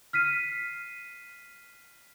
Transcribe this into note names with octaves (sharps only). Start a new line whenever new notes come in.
F6 B6 C7 D#7